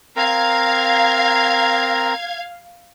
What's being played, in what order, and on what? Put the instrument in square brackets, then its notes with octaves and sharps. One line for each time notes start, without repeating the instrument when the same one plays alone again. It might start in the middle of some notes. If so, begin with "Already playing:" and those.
[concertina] C4 A#4 A#5 [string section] F5 G#6